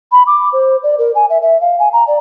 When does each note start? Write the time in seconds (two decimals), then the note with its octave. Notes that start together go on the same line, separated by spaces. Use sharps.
0.12 B5
0.27 D6
0.53 C5
0.83 D5
0.98 A#4
1.15 G#5
1.30 E5
1.42 E5
1.61 F5
1.79 G#5
1.93 A#5
2.07 D5